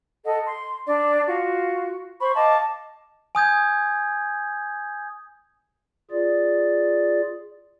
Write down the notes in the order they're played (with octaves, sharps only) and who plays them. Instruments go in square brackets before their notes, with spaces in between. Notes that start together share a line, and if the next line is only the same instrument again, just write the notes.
[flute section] A4 D#5 F#5
C6
D4 D5
F4 F#4
C5 B5 C#6
D#5 F5 A5 D6
[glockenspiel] G#5 D#6 G6 G#6
[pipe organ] F4 G#4 D5